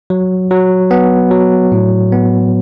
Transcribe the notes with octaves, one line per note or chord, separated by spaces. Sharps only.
F#3
F#3
B3
F#3
A2
B3